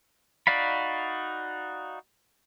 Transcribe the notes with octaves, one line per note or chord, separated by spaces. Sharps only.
D#4 F#4 D5 F5 B5